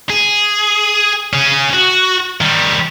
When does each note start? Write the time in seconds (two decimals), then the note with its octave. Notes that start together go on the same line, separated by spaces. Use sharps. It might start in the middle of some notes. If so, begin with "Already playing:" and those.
0.10 G#4
1.33 C#4 G#4
1.73 F#4
2.41 D#3 G3